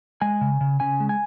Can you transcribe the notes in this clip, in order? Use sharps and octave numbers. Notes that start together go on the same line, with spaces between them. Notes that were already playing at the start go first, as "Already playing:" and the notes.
G#3 G#5
C#3
C#3
C#3 G#5
G#3
G#5